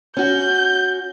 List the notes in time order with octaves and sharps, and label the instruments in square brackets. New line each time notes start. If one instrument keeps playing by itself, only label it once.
[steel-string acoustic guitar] C#4 F#4 [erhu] G6